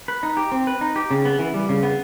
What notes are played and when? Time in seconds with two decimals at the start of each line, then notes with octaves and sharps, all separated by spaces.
0.08 B4
0.23 D#4
0.37 G4
0.52 C4
0.67 B4
0.81 D#4
0.96 G4
1.11 C#3
1.25 B3
1.39 E3
1.54 G3
1.69 C#3
1.83 B3